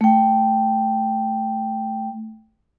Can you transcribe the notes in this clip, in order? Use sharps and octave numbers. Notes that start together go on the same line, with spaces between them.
A3 G5